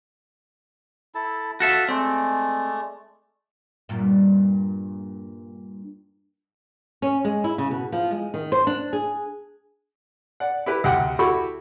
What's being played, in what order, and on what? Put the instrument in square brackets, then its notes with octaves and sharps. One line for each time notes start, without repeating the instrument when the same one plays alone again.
[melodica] E4 A4 A5
[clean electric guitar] F#4 A4 E5 [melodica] F5
[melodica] G#3 A3 D5 [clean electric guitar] C4
[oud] G2 A#2
[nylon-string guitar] C#4
G#3
E4
C#3
B2
F3
G#3
D#3
C5
D4
G#4
[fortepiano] D5 F#5
E4 G4 B4
D2 C3 F#5 G5
E4 F#4 G4 A4 B5 C#6